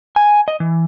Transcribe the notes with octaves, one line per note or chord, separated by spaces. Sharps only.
G#5
D#5
E3